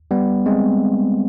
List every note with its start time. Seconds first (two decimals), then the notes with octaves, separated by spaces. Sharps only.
0.11 G3 B3
0.46 G#3 C4